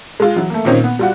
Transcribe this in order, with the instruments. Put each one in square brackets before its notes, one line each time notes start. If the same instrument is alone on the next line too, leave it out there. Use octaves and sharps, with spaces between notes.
[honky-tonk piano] G#3 F4
E3 F#3
A3 A#3
A#2 D#3 A#3 C4 C#4 D#4
B3
G3 F4 F#4